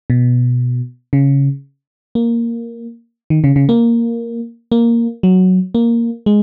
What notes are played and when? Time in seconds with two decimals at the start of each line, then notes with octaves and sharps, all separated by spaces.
0.10 B2
1.13 C#3
2.15 A#3
3.30 D#3
3.44 C#3
3.56 C#3
3.69 A#3
4.72 A#3
5.23 F#3
5.75 A#3
6.26 G#3